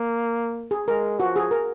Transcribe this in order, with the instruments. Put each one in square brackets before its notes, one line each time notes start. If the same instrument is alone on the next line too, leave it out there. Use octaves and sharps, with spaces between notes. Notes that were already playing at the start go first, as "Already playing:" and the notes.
Already playing: [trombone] A#3
[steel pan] G#4
[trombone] G#3 [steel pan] A#4
[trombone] F3 [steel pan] F#4
[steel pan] G#4
A#4